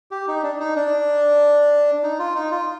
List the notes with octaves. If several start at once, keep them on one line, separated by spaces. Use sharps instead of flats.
G4
D#4
D4
D#4
D4
D#4
F4
D#4
F4